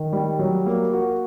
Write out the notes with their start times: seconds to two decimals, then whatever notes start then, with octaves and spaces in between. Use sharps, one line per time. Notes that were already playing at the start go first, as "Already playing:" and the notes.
Already playing: D#3
0.13 G3
0.39 F#3
0.66 A#3
0.93 F#4